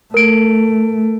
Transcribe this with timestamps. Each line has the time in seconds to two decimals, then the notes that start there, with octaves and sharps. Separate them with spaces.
0.14 A3 A#4 D7